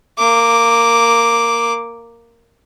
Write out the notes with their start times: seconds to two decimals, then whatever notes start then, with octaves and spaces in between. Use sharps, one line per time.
0.17 A#3 D6